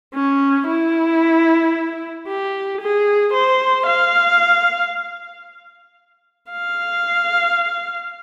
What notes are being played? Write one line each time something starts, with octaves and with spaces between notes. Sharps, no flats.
C#4
E4
G4
G#4
C5
F5
F5